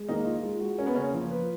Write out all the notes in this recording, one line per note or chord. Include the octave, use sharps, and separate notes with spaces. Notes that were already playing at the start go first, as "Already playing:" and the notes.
Already playing: G#3
D#3 A#3 D#4
F4
G#3
F#4
C#4 A#4
B3
C#3 A#3 C#4
F3
B4